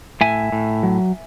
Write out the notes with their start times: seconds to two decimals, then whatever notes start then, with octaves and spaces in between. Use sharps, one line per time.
0.21 A2 E5 G#5
0.52 A2
0.83 F#3